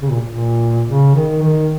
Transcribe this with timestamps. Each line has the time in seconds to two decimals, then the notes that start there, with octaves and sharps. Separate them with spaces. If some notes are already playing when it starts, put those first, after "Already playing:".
0.01 C#3
0.10 A#2
0.26 A#2
0.86 C#3
1.15 D#3
1.42 D#3